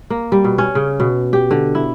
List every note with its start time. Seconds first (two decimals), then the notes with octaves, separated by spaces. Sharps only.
0.10 A#3
0.32 G3
0.44 B2
0.58 C#4
0.75 C#3
1.00 B2
1.33 G4
1.51 D3
1.75 E4